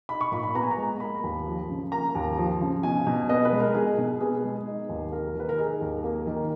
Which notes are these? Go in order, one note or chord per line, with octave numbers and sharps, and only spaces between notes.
D#4 B5
C#6
A#2 B5
B5
B3 A#5
G#5
A#5
G#3
A#3 B5
D#2
F3
C#3
A#3 A#5
D#2
F3
C#3
B2 G#5
B2
B3 D#5
B4
G#3
A#4
B2 G#4
B2
B3 G#4
G#3
D#4
D#2
A#3 A#4
D#3 B4
A#4
D#4 G#4
D#2
A#3
D#3